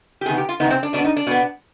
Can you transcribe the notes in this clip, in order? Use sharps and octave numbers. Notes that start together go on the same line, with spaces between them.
G4
C3 D#3 B3 G#4
G4
F4
C3 D#3 B3 D#4
C4
D4
B2 D4
B3
D#4
D4
B2 B3